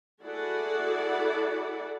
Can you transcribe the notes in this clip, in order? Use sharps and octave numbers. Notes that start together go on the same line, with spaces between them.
E4 F#4 G#4 A4 D5 F#5